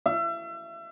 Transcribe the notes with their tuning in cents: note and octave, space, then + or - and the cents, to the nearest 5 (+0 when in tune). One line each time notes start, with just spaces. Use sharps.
E5 +35